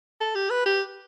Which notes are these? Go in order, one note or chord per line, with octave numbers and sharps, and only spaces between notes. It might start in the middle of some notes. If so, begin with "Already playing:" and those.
A4
G4
B4
G4